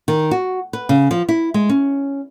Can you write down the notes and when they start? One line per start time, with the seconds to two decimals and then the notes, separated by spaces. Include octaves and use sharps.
0.08 D#3
0.31 F#4
0.73 B4
0.89 C#3
1.11 F3
1.29 E4
1.54 G#3
1.69 C#4